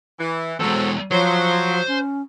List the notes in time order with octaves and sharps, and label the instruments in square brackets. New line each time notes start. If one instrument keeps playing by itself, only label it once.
[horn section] E3
[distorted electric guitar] E2 G#3 [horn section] F#3 C4 A4
[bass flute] F3 [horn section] F#3 [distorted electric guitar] C5
[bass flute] C#4